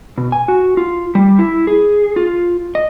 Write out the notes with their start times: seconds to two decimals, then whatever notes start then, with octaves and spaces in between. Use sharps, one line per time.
0.18 B2
0.32 G#5
0.48 F#4
0.77 F4
1.15 G3
1.39 E4
1.67 G#4
2.16 F4
2.75 D#5